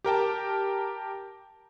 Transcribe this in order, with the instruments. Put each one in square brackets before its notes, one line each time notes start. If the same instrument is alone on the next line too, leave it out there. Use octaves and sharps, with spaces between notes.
[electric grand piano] G4 A#4 G5 A5